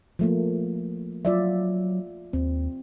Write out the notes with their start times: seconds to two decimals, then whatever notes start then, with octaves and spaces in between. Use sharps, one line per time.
0.19 F3 A3 A#3
1.25 F#3 F4 D5 E5
2.33 D#2 C4